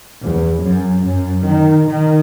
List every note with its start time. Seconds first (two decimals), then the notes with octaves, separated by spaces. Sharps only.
0.22 E2
0.64 F#2
1.06 F#2
1.47 D#3
1.89 D#3